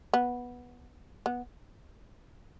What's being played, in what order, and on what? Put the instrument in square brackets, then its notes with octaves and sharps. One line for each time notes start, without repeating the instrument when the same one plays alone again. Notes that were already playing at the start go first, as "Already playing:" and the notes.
[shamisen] B3
B3